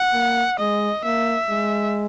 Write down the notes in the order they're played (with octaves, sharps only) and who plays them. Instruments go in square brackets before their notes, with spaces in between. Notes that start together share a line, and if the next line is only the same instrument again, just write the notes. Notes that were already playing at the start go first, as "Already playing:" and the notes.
Already playing: [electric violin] F#5
[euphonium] A#3
[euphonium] G#3 [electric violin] D#5
[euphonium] A#3 [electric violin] E5
[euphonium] G#3